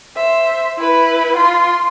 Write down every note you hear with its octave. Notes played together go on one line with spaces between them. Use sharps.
C5 E5
E4 B4
F4 C6